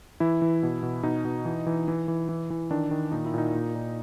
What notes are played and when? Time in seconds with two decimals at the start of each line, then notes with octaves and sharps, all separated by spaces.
0.20 E3 E4
0.42 E3
0.63 B2
0.83 B2
1.03 B2 D#4
1.25 B2
1.45 E3
1.66 E3
1.88 E3
2.08 E3
2.29 E3
2.50 E3
2.70 D#3 D4
2.91 D#3
3.12 A#2 D#4
3.25 E4
3.34 A#2 D#4
3.54 A#2
3.75 A#2